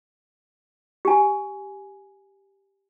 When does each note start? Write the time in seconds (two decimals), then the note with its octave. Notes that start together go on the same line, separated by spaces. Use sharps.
1.05 G4 G#5